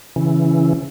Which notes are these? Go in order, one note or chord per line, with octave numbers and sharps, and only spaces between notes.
C#3 E3